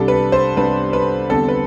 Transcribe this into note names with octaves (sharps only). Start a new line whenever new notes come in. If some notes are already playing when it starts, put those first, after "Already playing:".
Already playing: C2 C3 G3 D4 A4
B4
C5
C2 C3 G3 D4 B4
B4
E2 D3 G3 C4 A4
B4